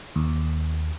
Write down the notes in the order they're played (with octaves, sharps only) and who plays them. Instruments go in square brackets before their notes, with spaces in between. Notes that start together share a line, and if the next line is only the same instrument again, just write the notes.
[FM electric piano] D#2